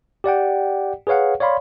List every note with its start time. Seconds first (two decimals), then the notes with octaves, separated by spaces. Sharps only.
0.24 G4 D5 F#5 G5
1.07 G#4 B4 C#5 F5 F#5
1.40 C#5 D5 F5 B5 C6